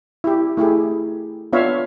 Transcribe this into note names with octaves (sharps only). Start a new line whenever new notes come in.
E4 G4
A3 E4 G4 G#4
B3 D4 F4 C#5 E5 F5